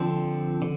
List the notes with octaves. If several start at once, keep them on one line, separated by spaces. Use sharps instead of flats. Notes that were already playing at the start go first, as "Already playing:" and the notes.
Already playing: D3 F3 C4
D3